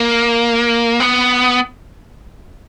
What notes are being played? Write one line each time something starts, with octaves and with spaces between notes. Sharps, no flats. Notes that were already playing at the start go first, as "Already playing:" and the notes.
Already playing: A#3
B3